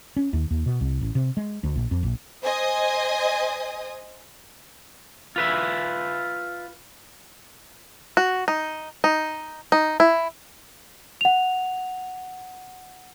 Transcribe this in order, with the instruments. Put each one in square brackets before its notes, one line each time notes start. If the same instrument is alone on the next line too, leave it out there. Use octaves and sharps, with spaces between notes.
[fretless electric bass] C#4
D#2
D#2
B2
C2
A1
C3
G#3
D2
A#1
F2
A#1
[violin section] C5 D#5 G#5 D#6
[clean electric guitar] F4 B4 E5
[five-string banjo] F#4
D#4
D#4
D#4
E4
[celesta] F#5 F7